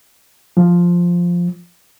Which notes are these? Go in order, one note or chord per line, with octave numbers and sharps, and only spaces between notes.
F3